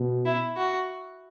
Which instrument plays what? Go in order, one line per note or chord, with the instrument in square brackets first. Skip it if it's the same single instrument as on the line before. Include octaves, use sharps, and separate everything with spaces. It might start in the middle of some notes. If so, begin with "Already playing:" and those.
Already playing: [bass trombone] B2
[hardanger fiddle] E4
F#4